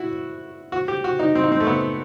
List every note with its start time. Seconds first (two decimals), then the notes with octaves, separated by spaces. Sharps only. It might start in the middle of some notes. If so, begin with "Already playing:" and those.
Already playing: E4 F#4
0.72 F#4
0.88 G4
1.04 F#4
1.19 D#4
1.35 C4
1.44 D#4
1.52 C4
1.60 A3
1.67 B3